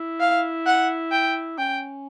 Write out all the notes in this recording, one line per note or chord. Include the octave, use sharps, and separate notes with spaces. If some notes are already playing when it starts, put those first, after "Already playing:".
Already playing: E4
F5
F#5
G5
C#4 G5